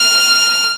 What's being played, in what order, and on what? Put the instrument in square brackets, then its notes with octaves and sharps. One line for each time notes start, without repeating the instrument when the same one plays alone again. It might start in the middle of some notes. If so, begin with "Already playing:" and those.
Already playing: [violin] F6